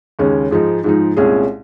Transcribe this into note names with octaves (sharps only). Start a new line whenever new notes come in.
D#2 C#3 G#3 C#4
G#2 F3 G#3 D#4
G#2 F3 G#3 D#4
C2 A#2 G#3 C#4 G#4